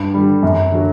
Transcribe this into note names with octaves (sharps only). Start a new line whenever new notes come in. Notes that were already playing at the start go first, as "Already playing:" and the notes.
Already playing: G2
D3 G3
F#2
D3 F#3